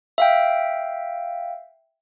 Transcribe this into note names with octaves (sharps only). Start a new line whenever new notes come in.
E5 F5 G5